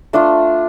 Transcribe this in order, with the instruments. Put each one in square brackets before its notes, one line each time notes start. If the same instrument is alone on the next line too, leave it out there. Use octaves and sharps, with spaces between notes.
[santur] A3 D4 F4